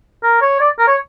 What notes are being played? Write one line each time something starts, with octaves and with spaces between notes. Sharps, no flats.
A#4
C#5
D5
A#4
C#5